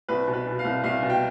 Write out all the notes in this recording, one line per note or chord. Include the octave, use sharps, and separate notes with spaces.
C2 B4
B2
B4
B2
F5
C2
C2 F5
B2
G5